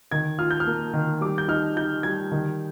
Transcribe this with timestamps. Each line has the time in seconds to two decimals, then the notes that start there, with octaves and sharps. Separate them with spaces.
0.11 D#3 G#6
0.38 F4 F6
0.51 G6
0.60 F6
0.67 A#3
0.93 D#3
1.21 G3 D6
1.38 G6
1.48 D#4 F6
1.77 D#4 G6
2.03 G3 G#6
2.32 D#3